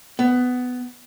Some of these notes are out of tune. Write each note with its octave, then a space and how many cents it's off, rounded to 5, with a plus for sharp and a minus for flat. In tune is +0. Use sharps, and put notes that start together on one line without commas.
B3 +15